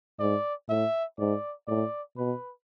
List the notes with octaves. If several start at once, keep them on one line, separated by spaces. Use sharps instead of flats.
G#2 D5
A2 E5
G#2 D5
A2 D5
B2 B4